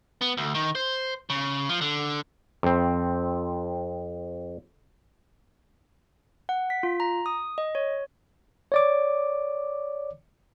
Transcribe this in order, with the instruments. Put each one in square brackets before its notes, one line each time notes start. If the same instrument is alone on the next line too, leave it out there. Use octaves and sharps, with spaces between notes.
[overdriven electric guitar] B3
D2
D#3
C5
C#3
F3
D3
[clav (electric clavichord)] F2 C4
[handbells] F#5
B6
F4
A#5
D#6
D#5
C#5
[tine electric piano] C#5 D5 D6